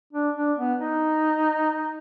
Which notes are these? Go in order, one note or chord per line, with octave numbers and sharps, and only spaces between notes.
D4
D4
B3
D#4